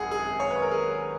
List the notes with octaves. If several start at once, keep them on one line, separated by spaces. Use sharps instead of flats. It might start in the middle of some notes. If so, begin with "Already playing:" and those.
Already playing: G#1 F#2 G#4 F#5
G#4
C#5
B4
A#4
G#4